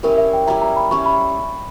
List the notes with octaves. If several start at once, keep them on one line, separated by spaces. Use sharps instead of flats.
G3 C#4 E4 A#4
E5
G5
G3 C#4 E4 A#5
A#5
B5
G3 C#4 E4 C#6
B5